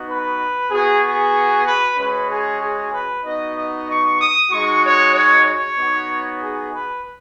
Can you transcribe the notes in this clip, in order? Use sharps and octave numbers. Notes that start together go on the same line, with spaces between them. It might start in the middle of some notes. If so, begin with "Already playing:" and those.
Already playing: B3 D#4 F#4
B4
B3 F#4 G#4
G#4
B4
G#3 C#4 F#4 B4
G#4
G#4
B4
B3 D#4 F#4 D#5
D#5
C#6
D#6
G#3 D#4 F#4 C#6
C#5
C#5
C#5
B3 D#4 F#4
G#4
B4